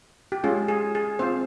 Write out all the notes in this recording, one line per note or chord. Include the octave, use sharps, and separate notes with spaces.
G4
G#3 C#4 F4 G#4
G#4
G#4
C4 F4 C5